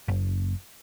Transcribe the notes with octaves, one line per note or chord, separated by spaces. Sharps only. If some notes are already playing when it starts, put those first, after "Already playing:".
F#1